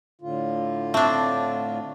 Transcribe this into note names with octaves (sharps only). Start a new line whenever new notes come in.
A2 D3 F4
C4 D4 E5 A5 C#6